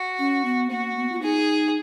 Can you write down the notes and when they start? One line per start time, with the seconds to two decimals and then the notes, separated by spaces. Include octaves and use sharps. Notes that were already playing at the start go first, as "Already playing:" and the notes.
Already playing: F#4
0.19 C#4
0.45 B3
0.70 A#3 F#4
0.97 B3
1.12 F4
1.22 D#4 G#4